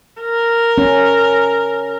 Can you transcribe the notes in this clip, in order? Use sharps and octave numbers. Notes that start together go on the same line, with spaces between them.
A#4
C#4